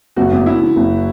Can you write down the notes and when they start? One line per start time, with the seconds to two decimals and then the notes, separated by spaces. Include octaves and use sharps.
0.16 F#1 F#4
0.31 E2
0.46 C#3 E4
0.61 E3
0.76 F#1